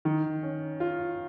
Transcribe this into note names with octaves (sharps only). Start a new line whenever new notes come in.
D#3
C#4
F4